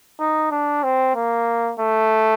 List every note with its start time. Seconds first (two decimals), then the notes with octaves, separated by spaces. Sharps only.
0.19 D#4
0.51 D4
0.83 C4
1.15 A#3
1.80 A3